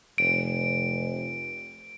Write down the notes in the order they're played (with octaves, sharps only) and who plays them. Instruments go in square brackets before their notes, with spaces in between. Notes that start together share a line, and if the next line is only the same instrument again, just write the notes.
[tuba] F1 [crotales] D7